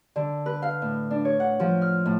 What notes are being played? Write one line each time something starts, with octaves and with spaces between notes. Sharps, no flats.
D3
B4
F5
A2
D4
C#5
F#5
F3
F6
A2